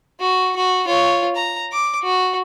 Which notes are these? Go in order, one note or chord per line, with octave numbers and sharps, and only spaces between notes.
F#4
F#4
F4 C#5
A#5
D6
F#4